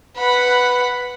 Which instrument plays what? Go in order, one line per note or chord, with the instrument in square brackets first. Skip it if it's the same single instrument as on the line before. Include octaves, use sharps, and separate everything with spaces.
[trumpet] B4 [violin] F#5 B5